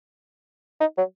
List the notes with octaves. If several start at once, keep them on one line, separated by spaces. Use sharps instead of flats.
D#4
F#3